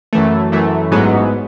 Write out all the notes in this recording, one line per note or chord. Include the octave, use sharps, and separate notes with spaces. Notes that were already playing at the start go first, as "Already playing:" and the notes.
F#2 E3 A3
F#2 E3 A3
A1 G#2 F#3 B3